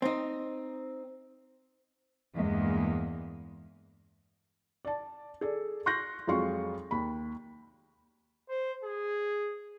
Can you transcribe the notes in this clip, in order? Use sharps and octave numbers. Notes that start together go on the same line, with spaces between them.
C4 D#4
E2 G2 G#3 A#3
D5 A5
G#4 A4 D5
C6 C#6 F#6 G6 A#6
F2 F#3 G#3 F4 C6 C#6
D#2 B5
C5
G#4